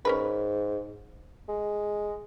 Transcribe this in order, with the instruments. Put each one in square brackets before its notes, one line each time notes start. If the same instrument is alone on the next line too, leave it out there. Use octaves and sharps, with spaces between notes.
[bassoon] G#2 [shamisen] C#4 A#4 B4
[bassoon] G#3